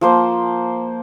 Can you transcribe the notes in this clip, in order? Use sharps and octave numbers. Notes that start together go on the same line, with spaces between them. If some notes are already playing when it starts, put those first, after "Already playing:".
F3 A#3 C5